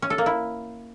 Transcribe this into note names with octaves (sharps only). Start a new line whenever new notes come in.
C#4
A4
A#3
E4